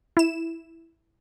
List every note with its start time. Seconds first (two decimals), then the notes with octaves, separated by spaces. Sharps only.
0.17 E4 E7